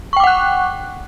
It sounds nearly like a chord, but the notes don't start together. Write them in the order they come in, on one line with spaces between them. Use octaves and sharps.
C#6 G5 D6 F#5 F#6